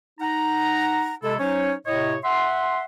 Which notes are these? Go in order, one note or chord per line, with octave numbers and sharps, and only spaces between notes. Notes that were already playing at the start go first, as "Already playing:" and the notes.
D#4 F#5 A#5
C3 G#3 E4 A4
F#3 C#4 D#4 C5 C#5
A2 C3 C#5 D#5
E5 F#5 C6